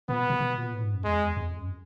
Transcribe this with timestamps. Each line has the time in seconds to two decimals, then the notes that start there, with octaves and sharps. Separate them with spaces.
0.09 A#2 B3
0.19 B2
0.30 B2
0.40 B2
0.56 A#2
0.73 A2
0.83 G#2
0.94 F#2
1.04 E2 G#3
1.16 F2
1.26 E2
1.37 E2
1.47 F2
1.58 F#2